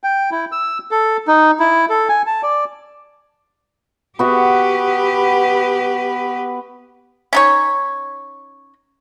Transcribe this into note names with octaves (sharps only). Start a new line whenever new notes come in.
G5
E4
E6
A4
D#4
E4
A4
G#5
A5
D5
B3 F#4 G4 B4 E5
C#4 D#4 C#5